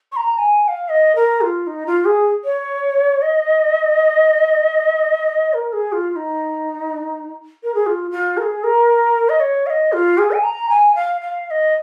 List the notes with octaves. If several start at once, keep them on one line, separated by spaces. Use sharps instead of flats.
C#6
A#5
G#5
G#5
F5
D#5
A#4
F4
D#4
F4
G#4
C#5
D#5
A#4
G#4
F4
F4
D#4
A#4
G#4
F4
F4
A#4
G#4
A#4
D#5
C#5
F5
D#5
F4
G#4
G#5
A#5
G#5
F5
F5
F5
D#5